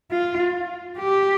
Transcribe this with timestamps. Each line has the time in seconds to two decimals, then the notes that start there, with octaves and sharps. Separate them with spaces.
0.11 F4
0.99 G4